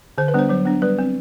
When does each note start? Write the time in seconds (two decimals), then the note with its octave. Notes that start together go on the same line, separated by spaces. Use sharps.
0.18 D3 C5
0.28 B4
0.34 G3 B3 D4 C5
0.49 F#3 C5
0.66 B3 D4
0.82 G3 B4
0.99 C4